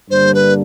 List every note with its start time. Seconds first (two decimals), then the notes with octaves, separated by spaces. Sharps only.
0.10 G2 D3 G3 A#3 D4 C5
0.35 B4